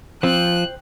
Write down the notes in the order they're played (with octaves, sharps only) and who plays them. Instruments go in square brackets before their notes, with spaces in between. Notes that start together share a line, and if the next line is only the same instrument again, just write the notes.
[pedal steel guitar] F3 [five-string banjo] C4 [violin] F#6